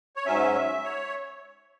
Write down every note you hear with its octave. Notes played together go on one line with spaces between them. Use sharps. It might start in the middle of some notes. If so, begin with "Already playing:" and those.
C#5
G#2 F#3 C#4 E5
E5
C#5